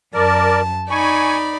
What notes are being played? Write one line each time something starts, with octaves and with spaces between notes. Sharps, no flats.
F#2 A#4 D5 A5
D#4 D5 G#5 B5 C#6